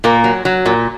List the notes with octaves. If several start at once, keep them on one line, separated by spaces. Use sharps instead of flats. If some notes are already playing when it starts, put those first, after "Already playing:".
A#2 A#3
F#3
F#3
A#2